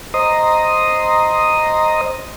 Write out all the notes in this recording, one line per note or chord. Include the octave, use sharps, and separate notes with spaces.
C5 D#5 A#5 C6 D#6